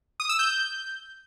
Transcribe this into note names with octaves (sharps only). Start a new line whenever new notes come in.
D#6
E6
G6